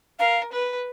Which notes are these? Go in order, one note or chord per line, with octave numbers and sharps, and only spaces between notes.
A#4 F5
B4